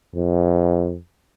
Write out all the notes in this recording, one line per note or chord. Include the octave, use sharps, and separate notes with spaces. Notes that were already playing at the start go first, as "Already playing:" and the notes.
F2